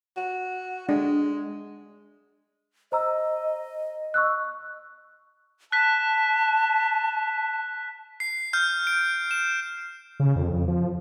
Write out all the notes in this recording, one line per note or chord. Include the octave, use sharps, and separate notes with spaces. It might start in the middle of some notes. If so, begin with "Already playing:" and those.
F#4
G#3 D4
C5 D#5 A#5 E6
C#6 E6 F#6
A5 F#6 B6
C7
F6 G6
D7
E7
C#3
F2
F2
F3